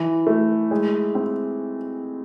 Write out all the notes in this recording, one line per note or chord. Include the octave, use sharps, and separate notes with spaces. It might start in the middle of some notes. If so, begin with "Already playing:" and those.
Already playing: E3
A3
G#3
C4